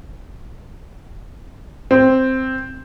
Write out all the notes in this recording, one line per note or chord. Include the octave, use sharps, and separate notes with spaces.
C4